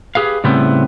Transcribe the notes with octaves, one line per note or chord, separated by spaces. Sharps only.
G4 G#4 B4 F5
A2 C#3 G3 B3 C4 E4